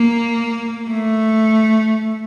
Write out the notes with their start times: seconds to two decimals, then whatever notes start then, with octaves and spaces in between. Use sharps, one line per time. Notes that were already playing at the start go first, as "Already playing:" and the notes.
Already playing: A#3
0.90 A3